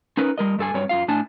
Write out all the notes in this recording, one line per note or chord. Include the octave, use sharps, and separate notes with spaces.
C#4 D#4 A#4 B4
G3 A#4 D#5
G2 A4 G#5
G2 F#3 G3 C4 C#5
F#2 F4 F5
A2 D4 G#5 A5